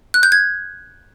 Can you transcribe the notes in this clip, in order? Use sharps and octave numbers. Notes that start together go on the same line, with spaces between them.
F#6
G6
G#6